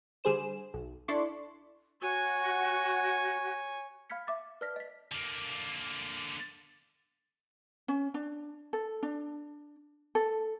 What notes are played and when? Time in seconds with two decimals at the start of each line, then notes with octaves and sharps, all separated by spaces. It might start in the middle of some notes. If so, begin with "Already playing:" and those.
0.24 D3 G3 G#4 C5 E7
0.74 B1
1.08 D4 E4 A4 D5 C6 C#6
2.01 F#4 C#5 G#5
4.10 F5 B5 F6 G#6 B6 C#7
4.27 E5 D6 A6
4.61 B4 D5 A5 F6 A#6 B6
4.76 D#5 B6
5.12 D3 A#3
7.88 C#4
8.14 D4
8.73 A4
9.03 D4
10.15 A4